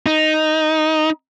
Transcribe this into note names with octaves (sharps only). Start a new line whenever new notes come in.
D#4